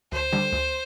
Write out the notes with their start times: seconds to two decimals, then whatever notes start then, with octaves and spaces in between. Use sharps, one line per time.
0.12 D2 C5
0.32 D3 G3
0.52 D2